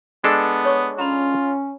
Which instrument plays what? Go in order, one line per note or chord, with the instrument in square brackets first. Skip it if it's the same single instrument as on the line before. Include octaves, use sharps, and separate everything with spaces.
[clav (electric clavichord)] G#3 D4 A4 [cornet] B3
[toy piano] C#5 C#6 D#6
[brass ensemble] C#4 [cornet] F4 [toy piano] A#5 B5